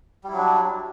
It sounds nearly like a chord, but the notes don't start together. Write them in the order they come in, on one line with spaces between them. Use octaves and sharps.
G3 E4 F#3 D4